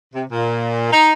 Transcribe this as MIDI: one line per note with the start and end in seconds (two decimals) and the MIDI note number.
0.14 0.25 48
0.32 0.89 46
0.91 1.13 63